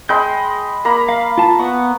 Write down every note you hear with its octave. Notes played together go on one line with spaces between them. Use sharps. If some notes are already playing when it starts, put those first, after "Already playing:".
G#3 D#5 G5 B5 G6
A#3 A#5 B5
F5
F4 A5
B3 F#5 C#6